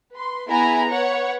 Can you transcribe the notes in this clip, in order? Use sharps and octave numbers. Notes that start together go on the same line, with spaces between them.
B4 C6
B3 E4 G#4 G#5 A#5 B5
B4 C#5 F#5 C#6